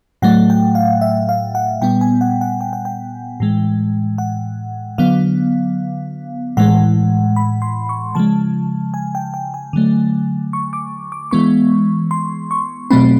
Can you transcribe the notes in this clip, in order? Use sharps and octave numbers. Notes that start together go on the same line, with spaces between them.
A2 F#3 A3 F#5
G5
F5
E5
F5
F#5
A#2 G3 B3 G5
G#5
F#5
F#5
G5
F#5
G5
A2 E3 G#3
F#5
D3 F#3 B3 F5
A2 E3 G#3 F#5
B5
C6
C#6
C#3 F3 G#3 A5
G#5
G5
G5
G#5
D3 F#3 A3
C#6
D6
D6
E3 G#3 B3 C#6
C6
C#6
B2 F#3 A3 C4 B5